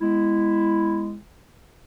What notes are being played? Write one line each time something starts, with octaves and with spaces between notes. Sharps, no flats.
G#3 B3 E4